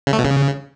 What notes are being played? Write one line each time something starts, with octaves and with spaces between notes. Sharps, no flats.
C#3
A3
B2
C#3